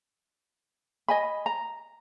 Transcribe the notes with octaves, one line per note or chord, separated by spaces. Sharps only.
D#5 G#5 B5
A#5